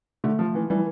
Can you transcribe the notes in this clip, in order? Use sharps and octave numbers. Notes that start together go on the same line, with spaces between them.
D3 A3
F3
E3
E3 G3